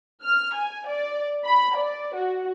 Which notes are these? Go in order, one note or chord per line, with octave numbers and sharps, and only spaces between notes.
F6
G#5
D5
B5
D5
F#4